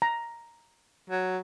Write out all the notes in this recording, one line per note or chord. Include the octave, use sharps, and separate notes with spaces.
A#5
F#3